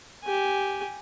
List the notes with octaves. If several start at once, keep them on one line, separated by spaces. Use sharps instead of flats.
G4 G#5